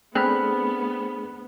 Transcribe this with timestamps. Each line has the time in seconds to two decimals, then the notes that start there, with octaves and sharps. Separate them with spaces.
0.15 A3 B3 C4 D4 G#4 B5 F6 F#6